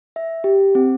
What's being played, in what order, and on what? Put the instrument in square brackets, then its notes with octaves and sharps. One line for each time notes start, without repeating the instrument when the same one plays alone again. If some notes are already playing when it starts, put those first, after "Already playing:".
[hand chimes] E5
G4
C4